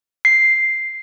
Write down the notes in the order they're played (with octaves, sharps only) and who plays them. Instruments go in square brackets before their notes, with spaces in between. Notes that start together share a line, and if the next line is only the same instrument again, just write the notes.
[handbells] C7